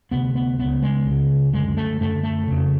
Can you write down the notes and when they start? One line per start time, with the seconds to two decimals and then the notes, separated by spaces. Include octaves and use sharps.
0.11 D2 C3 B3
0.35 B3
0.59 C#2 C#3 B3
0.82 G#3
1.06 C#2
1.11 C#3
1.53 F#2 D3 G#3
1.77 A3
2.00 F#2 D3 A3
2.23 A3
2.48 F2 C#3